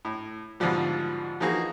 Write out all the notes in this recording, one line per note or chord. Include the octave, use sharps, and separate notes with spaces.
A2
G#2 B2 D3 F3 G3
E3 F3 A#3 D#4 F#4 G#4